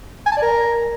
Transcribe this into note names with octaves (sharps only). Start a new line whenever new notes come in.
G#5
A5
D5
A#4